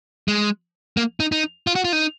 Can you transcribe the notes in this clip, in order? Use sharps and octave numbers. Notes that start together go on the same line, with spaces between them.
G#3
A#3
D#4
D#4
F4
F#4
F4
D#4